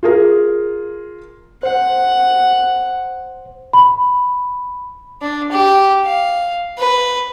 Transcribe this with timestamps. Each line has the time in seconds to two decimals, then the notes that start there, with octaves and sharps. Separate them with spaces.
0.03 F4 G#4 A#4
1.63 C5 F#5
3.73 B5
5.21 D4
5.52 G4
6.05 F5
6.78 B4